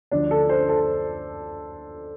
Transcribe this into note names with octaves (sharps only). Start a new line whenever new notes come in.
D2 D3 F3 D4
A4
C5
A4